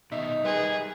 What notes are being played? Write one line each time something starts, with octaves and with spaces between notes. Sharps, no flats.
B2 D#3 D#4 E5
G3 G4 G#4 A#4 B4